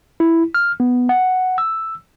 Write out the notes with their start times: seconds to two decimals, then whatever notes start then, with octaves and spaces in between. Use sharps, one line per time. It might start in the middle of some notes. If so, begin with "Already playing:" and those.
0.20 E4
0.54 F6
0.80 B3
1.09 F#5
1.58 E6